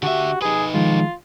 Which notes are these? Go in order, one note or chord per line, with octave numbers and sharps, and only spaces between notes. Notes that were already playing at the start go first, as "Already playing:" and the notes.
D3 F#4 G4 E5
D#4 G#4 B4
D#3 F3 G#3 F4